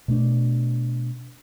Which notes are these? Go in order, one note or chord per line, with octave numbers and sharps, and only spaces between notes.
B2 A3 D4